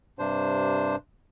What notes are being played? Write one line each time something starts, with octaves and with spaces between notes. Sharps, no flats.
G2 C3 D4 C5